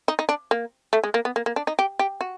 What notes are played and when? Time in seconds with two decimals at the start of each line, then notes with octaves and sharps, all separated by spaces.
0.08 D#4
0.19 D#4
0.29 D4
0.51 A#3
0.93 A3
1.04 G#3
1.14 A#3
1.25 B3
1.36 A#3
1.46 A#3
1.56 D4
1.67 D#4
1.79 G4
1.99 G4
2.21 F#4